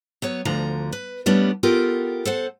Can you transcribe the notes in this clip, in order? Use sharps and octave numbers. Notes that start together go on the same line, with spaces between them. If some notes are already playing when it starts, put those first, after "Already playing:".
F#3 B3 C#5
D2 D3 F3 A#5
B4
G3 A3 B3 C#4 D4
B3 F4 G4 A4 A#4
A4 C5 F#5